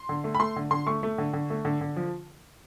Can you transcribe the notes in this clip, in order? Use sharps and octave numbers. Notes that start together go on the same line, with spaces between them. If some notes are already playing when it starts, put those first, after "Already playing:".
Already playing: C6
D3
A3
B5
A3 C6
D3
D3 C6
A3 C#6
A3
D3
D3
A3
D3
D3
F3